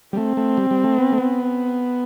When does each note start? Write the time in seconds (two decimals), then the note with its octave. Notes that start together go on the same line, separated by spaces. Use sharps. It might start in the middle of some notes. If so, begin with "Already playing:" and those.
0.13 G3
0.16 A3 C4
0.37 A3
0.57 G3
0.71 G3
0.84 A3
0.98 B3
1.12 A3
1.18 B3